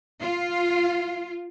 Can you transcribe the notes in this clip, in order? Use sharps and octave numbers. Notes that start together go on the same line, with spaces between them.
F4